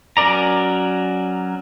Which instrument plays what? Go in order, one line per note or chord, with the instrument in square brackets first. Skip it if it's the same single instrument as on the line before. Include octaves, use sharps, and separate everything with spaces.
[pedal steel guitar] F#3 C#4 A#4 D5 A#5